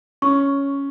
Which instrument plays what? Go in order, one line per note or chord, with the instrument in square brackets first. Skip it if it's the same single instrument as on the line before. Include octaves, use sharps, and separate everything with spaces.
[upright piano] C#4 [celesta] C#6